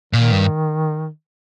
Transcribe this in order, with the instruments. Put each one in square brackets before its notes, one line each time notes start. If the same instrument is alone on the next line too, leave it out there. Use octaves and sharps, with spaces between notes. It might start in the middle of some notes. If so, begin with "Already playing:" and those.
[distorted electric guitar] A#2 [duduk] D#3
[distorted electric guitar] G2